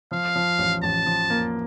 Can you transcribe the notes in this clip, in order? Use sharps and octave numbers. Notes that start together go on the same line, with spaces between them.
F3 F5
F3
A1
A1 A5
F3
A#3